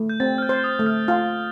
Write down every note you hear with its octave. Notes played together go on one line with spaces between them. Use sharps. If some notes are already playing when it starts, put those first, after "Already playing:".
Already playing: A3
G6
C4 A6
F6
G6
C5
D#6
A3
F6
F4 F6